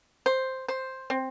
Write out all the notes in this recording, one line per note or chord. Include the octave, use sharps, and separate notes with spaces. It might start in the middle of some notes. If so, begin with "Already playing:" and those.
C5
C5
C4